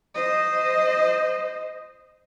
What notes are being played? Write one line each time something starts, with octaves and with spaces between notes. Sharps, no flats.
C5 D#5